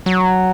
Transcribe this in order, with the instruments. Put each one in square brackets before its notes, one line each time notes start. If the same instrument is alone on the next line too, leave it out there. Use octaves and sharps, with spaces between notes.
[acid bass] F#3